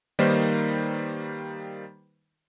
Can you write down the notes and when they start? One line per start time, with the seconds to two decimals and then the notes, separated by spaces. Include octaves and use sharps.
0.19 D#3 G3 A#3 D#4 B4 C5